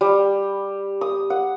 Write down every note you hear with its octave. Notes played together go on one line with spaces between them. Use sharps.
G3
D#6
F#5